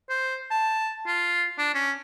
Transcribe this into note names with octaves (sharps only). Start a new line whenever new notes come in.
C5
A5
F4
D4
C#4